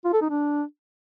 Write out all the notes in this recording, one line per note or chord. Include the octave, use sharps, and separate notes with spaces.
F4
A4
D#4
D4